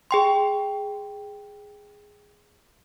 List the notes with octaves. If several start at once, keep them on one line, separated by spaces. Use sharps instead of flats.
G#4 G5 C6